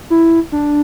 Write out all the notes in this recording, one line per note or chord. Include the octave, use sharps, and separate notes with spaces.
E4
D4